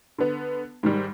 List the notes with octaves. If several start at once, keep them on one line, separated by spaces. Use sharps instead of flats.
D3 B3
G#2 D#3 G3